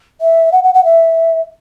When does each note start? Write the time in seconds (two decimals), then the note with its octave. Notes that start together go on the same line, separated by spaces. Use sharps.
0.21 E5
0.52 F#5
0.63 F#5
0.74 F#5
0.84 E5